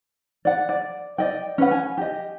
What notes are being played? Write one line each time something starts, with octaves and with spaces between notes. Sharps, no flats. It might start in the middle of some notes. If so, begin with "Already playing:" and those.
D5 F#5
D5
D5 D#5 G5
C#4 B4 F#5
G#5
G4 D#5